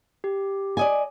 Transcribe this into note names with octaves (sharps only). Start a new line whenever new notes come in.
G4
D5 D#5 G#5